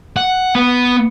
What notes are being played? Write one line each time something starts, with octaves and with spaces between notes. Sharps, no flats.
F#5
B3